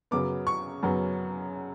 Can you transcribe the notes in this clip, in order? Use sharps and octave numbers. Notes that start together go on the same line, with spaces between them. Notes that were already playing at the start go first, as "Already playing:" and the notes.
F#2 C#3 F#3 B3 D6
C#6
F#2 C#3 F#3 B3